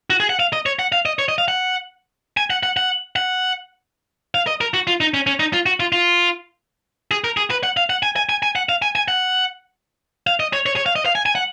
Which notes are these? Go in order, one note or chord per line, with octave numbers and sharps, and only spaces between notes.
F#4
G#4
F#5
F5
D#5
C#5
F#5
F5
D#5
C#5
D#5
F5
F#5
G#5
F#5
F#5
F#5
F#5
F5
D#5
A#4
F#4
F4
D#4
C#4
C#4
D#4
F4
F#4
F4
F4
G#4
A#4
G#4
B4
F#5
F5
F#5
G#5
G#5
G#5
G#5
F#5
F5
G#5
G#5
F#5
F5
D#5
C#5
C#5
C#5
F5
D#5
F5
G#5
G#5
F#5